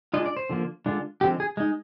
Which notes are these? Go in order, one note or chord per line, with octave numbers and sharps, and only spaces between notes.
G#3 D4 F4 D#5
D5
C5
D3 F3 A#3
D3 G#3 D4 F4
D3 F3 G#3 C4 G4
G#4
G#3 D#4